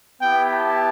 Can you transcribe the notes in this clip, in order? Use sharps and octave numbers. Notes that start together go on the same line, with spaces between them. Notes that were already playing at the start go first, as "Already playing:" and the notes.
B3 E4 G4 G5
A5